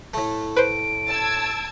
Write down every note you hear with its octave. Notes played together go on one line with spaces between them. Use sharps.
A2 A3
B4 C5 D7
A5 E6 G#6